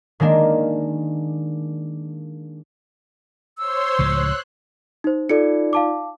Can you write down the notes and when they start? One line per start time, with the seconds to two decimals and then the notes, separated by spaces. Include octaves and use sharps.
0.20 D#3 G#3 A#3 D4
3.58 C5 C#5 C6 E6
3.99 C#2 A2 F3 F#6
5.04 D#4 C5
5.29 D#4 F4 A4 D5 C#7
5.73 F5 A5 D6